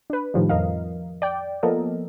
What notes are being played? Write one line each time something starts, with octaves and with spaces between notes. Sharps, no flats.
D4 B4
A2 D#3 F3 G3
F2 F3 A#4 D#5 F5
D5 G5
F3 A#3 B3 A4 A#4 D#5